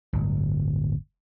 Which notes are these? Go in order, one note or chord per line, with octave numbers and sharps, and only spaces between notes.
D1 G1